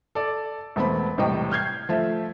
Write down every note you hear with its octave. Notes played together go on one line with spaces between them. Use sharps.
A4 D5
E1 A3 B3 C4 B5
E1 A2 C3 G3 D#5 G5
F6 G6 G#6 C7
F3 A3 E5